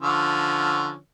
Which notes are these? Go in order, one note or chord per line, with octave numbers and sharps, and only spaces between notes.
D3 F3 C#4